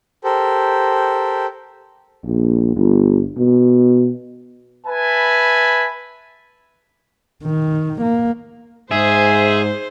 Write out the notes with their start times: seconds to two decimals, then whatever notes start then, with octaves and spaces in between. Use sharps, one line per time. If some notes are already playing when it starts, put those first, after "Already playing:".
0.24 G4 A4 A#4 C5
2.26 A#1
2.76 G1
3.38 B2
4.86 B4 E5 G#5 A5 B5
7.44 D#3
8.02 A#3
8.91 G#2 G#4 C5 E5